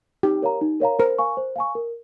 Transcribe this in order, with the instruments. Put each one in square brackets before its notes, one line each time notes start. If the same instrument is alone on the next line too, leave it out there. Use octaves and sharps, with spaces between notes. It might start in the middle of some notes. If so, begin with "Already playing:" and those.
[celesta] D#4 [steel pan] G4
[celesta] A#4 C#5 F5 A#5
D#4
A#4 C#5 F5 A#5
[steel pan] A#4 [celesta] C5
[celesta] F5 G#5 C#6
C5
F5 G#5 C#6
A#4